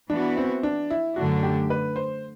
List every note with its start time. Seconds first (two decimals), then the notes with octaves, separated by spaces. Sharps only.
0.10 E3 B3 D4 F#4
0.37 C4
0.63 D4
0.90 E4
1.16 F#2 D3 A3 D4 F#4
1.43 G4
1.70 B4
1.96 C5